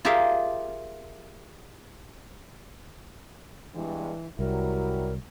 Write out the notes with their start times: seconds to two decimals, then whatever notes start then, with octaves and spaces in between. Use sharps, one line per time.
0.05 F4 G4 G#4 A#4 E5 F5
3.74 E2 G2 E3 G#3
4.39 C2 F#3 G3 E4 A#4